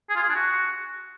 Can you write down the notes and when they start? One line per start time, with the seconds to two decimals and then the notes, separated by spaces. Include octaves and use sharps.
0.09 G#4
0.16 F4
0.22 G#4
0.29 D4
0.35 F#4